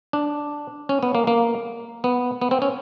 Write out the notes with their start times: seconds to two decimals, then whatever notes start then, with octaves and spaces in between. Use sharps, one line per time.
0.13 D4
0.89 C#4
1.03 B3
1.15 A#3
1.27 A#3
2.04 B3
2.42 B3
2.51 C4
2.62 C#4